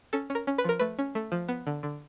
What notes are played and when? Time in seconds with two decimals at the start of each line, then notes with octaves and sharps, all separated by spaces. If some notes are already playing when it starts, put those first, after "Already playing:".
0.13 C#4 A4
0.30 C#4
0.35 A#4
0.47 C#4
0.58 B4
0.64 F3 A#4
0.80 A3 B4
0.99 C#4
1.15 A3
1.32 F3
1.48 B3
1.67 D3
1.83 D3